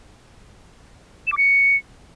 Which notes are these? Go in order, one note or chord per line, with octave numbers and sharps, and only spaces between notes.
E7
D6
C#7